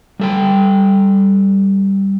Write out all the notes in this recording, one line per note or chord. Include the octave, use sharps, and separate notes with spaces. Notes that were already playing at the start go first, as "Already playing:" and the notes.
G3 A4 G5